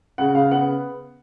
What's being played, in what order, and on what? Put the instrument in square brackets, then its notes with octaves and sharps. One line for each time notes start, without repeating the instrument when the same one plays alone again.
[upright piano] C#3 F#5
C#3 F5
B3 F#5